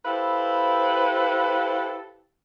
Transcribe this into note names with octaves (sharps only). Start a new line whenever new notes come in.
E4 G4 A4 B4 C5 F5